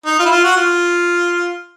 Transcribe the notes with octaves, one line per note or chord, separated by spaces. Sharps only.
D#4
F4
E4
F4
F#4
F4